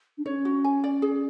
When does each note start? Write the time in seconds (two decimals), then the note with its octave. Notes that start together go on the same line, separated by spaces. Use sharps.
0.18 D4
0.26 C#4 C#5
0.45 F#4
0.64 G#5
0.84 D5
1.02 G#4